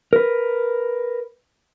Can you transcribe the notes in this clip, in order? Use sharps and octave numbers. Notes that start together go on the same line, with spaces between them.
A#4 B4